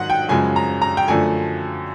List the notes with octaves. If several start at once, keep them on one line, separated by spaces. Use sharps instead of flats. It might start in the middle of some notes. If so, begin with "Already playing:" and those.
Already playing: G#2 D#3 F#3 F#5
G5
F#2 C#3 F3 G#3 G#5
A#5
A#5
G5
F#2 D3 F3 A3 G#5